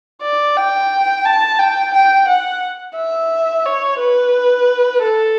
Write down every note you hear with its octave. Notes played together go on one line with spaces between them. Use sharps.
D5
G5
A5
G5
G5
F#5
E5
C#5
B4
A4